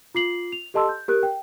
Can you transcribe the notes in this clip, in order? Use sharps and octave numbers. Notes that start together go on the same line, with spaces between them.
F4 D6 C7 F#7
F7
G4 A4 D#5 A5 C6 E6
G6
G4 A#4 F#6
G5